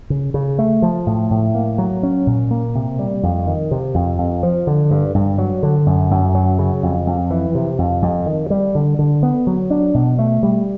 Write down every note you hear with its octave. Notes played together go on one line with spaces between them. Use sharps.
C#3
C#3
A3
F3
A2
A2
A#3
F#3
C#4
A#2
A#3
C3
G3
F2
D#3
C3
F2
F2
F3
D3
G2
G2
F#3
D3
F#2
F#2
F#3
C#3
F2
F2
E3
C3
F2
F2
D#3
G3
D3
D3
B3
F#3
D4
B2
A3
G3